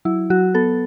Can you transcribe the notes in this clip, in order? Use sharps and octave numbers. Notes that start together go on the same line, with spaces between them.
F#3 E4
F#3 F#4
B3 A4